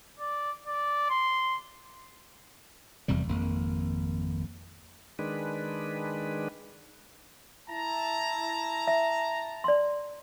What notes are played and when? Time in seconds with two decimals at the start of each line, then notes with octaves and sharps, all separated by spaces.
0.19 D5
0.67 D5
1.10 C6
3.08 F1 E2 C3 G3
3.28 G#1 F2 A#3
5.19 D#3 G#3 D4 B4
7.69 E4 A5 A#5
8.87 E5
9.64 D5 C6